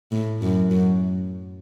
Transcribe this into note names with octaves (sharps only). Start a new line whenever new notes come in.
A2
F#2
F#2